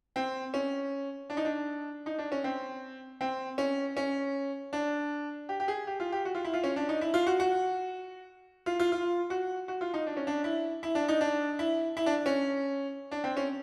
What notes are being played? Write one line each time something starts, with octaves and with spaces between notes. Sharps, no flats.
C4
C#4
D4
D#4
D4
D#4
D4
C#4
C4
C4
C#4
C#4
D4
G4
G4
G#4
G4
F4
G4
F#4
F4
E4
F4
C#4
D4
D#4
E4
F4
F#4
F#4
F4
F4
F4
F#4
F#4
F4
D#4
D4
C#4
D4
E4
E4
D4
D#4
D4
E4
E4
D4
C#4
D4
C4
C#4